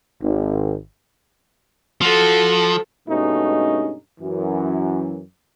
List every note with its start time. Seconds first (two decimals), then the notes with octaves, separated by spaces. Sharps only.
0.21 G#1
2.01 F3 F#4 A4
3.08 G2 B2 G#3 A3 C#4 D#4
4.20 F#2 E3